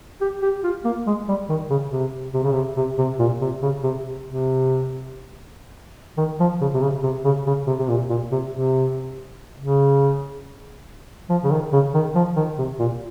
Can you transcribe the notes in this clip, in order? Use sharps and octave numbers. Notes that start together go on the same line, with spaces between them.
G4
G4
F4
A#3
G#3
G3
D#3
C#3
C3
C3
C#3
C3
C3
C3
A#2
C3
C#3
C3
C3
D#3
F3
C#3
C3
C#3
C3
C#3
C#3
C3
C3
A#2
A#2
C3
C3
C#3
F3
C#3
D#3
C#3
D#3
F3
D#3
C3
A#2